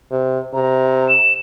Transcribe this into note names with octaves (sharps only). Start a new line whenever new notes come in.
C3
C3 A#5
E7